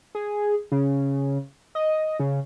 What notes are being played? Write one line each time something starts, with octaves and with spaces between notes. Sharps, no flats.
G#4
C#3
D#5
C#3